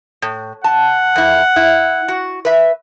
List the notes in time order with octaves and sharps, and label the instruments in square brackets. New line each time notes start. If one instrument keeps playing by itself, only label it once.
[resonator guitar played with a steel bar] A2
[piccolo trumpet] F#5 [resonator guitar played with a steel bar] A5
[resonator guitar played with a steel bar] F2 E4
E4
F#4
B4 E5